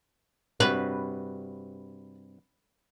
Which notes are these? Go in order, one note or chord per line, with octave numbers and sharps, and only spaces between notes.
G2 C3 F#4 B4